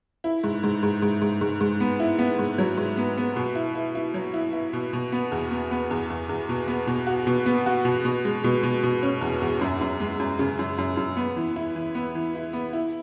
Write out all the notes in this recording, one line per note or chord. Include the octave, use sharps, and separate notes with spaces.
E4
G#2
G#2
G#2
G#2
G#2
G#2
G#2
B3
E4
B3
G#2
F#3
G#2
B3
B3
B2
E4
E4
E4
F#3
E4
E4
B2
B2
B3
E2
B3
B3
E2
E2
E2
B2
B3
B2
F#4
B2
B3
F#4
B2
B2
G#3
B2
B2
B2
C#4
E2
E2
F#2
F#2
G#3
F#2
C#3
F#2
F#2
F#2
B3
E3
E4
E3
B3
E3
E4
B3
E4